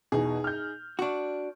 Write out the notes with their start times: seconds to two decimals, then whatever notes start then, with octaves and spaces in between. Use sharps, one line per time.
0.12 E2 B2 D#4 G#4
0.44 F6 G6
0.99 D4 F#4 C#6